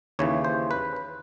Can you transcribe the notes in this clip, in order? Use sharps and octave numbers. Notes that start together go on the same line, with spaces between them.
D#2 C#3 E3 C#5
C5
B4
B4